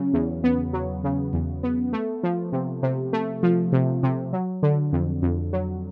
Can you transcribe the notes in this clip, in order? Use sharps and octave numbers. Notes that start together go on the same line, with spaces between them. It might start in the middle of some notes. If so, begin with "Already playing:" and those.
Already playing: C#3 F#3
E2
B3
F#3
C#3
E2
B3
A3
F3
C3
C3
A3
F3
C3
C3
F#3
D3
F2
F2
F#3